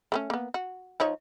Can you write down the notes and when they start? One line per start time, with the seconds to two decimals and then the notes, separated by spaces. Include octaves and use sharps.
0.12 A3 B3 C#4
0.30 A#3 B3
0.54 F#4
1.00 F3 D#4 C#5